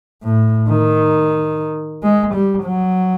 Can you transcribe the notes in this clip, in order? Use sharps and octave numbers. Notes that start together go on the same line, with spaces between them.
A2
D#3
G#3
G3
F#3